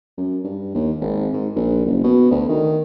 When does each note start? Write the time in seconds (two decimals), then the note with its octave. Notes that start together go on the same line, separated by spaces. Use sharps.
0.18 F#2
0.44 G2
0.74 D#2
1.01 G#1
1.33 G#2
1.56 A#1
1.86 F#1
2.04 B2
2.31 D2
2.49 D#3